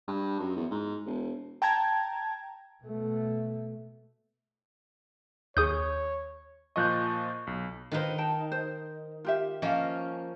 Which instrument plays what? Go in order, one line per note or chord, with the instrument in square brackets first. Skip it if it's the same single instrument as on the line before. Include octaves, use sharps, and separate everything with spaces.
[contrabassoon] G2
F#2
E2
G#2
E1
[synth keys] G5 A5 A#5 G#6
[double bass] B2 A3
[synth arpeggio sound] D#2 G#4 C#6 [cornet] C#5 [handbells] D#6 G6
[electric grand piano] A#2 F3 D#5 [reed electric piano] C#6 F#6 G6
[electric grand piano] B1
[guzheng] D#3 D#4 [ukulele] F4 B4 C5
[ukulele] G5 A5
C5
F4 G4 E5
[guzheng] F3 A#3 C#4 [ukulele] D#5 F5